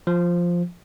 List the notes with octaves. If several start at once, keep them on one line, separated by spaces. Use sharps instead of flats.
F3